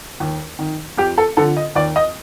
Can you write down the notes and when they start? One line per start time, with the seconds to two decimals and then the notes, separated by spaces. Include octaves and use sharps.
0.20 D#2
0.59 D#3
0.98 F2 G4
1.18 A4
1.37 D3 F3 A4
1.57 D#5
1.75 D#2 D5
1.96 D#5